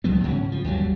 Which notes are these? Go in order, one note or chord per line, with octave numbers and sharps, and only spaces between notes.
C#2 F3 F#3 B3
G#2 C#3 C4 C#4
F3
G1 D#2 F#3 G3